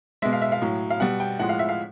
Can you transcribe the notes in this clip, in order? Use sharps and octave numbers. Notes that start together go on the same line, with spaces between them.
B2 G#3 E5
F5
E5
F5
A2 F#3
F5
B2 G3 F#5
G5
A2 F3 G#3 F#5
F5
E5
F5